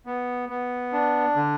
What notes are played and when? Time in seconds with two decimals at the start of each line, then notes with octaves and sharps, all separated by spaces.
0.06 B3
0.49 B3
0.93 D4
1.36 D3